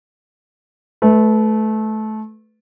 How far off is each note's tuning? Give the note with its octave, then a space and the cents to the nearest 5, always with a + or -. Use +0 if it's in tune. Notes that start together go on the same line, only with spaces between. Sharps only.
A3 -20 B4 +5